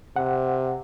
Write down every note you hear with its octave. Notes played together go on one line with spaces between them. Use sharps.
C3 F#5